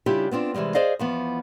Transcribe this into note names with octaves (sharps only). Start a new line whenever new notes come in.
C#3 G3 D4 E4 F4 G4
B3 C4 D4 F4
C3 E3 F3 G3 G#3
G#4 C5 D5 D#5 F5
E2 F3 B3